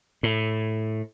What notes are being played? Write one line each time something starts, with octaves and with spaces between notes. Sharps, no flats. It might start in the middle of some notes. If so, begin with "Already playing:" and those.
A2